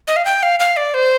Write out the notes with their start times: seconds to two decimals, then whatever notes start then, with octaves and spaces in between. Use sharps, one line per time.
0.08 D#5
0.16 F5
0.25 G5
0.43 F5
0.60 F5
0.77 D5
0.94 C5